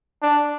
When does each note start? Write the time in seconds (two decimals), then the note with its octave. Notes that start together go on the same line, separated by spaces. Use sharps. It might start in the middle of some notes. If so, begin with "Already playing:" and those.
0.22 D4